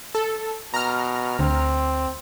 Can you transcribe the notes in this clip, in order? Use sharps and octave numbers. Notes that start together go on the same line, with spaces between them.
A4
B2 A#5 F6
D2 C4